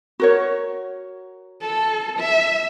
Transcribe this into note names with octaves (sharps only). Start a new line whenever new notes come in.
F#4 A#4 C#5
A4
E5